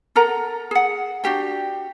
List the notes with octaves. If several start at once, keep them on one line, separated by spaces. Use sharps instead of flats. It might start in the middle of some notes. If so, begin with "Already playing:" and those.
A4 A#4 F#5 A#5
G#4 F#5
D4 F#4 G4 G5